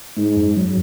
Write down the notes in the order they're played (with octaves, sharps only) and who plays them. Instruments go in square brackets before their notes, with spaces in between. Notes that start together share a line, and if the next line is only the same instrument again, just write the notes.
[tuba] G#2 [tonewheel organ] G#3
[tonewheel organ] F#2
F#3